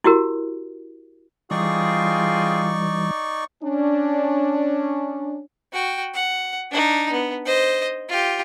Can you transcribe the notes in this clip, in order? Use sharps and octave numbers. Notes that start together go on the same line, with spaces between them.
E4 F#4 G4 A#4
E3 G3 C4 D#4 F4 G#4 D5 C#6
C#4 D4
F#4 G5
F#5
D4 D#4
B3
C5 D#5
F4 G4